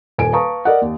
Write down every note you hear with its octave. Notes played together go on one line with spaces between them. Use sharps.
D#1 A4 G#5 D7
B4 F5 A5 A#5 C#6 D#6
A#4 D5 D#5 F#5
D#2